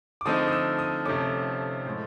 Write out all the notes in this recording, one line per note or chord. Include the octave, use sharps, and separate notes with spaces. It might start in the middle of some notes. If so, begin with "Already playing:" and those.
D6
D3 F3 A3 C4 D#4 D#6
D#6
E6
D#6
F2 C3 F3 A3 C#4 D6
A2 F3 G#3